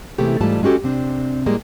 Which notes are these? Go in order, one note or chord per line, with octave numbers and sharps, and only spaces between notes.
C3 E3 G#3 A3 B3 G4
G#2 E3 G3 A3 F4 A5
G#3 C#4 F#4 G4 A4
C3 C4 D4
A2 G3 G#3 A#3